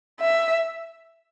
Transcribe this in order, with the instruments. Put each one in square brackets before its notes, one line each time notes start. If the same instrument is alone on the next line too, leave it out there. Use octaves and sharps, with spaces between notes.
[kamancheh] E5